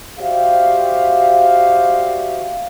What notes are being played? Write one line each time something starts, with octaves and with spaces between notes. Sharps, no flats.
F#4 G4 C5 D5 E5 F5